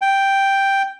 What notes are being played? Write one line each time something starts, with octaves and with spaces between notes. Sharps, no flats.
G5